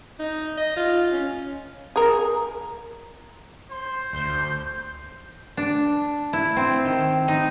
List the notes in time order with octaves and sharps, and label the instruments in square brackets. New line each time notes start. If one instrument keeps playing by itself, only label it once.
[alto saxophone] D#4
D#5
F4
C#4
[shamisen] G#4 A#4
[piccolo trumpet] C5 [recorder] C6
[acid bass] D2 [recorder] C6 [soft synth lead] G6
[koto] D4
E4
C4
D#3
D#4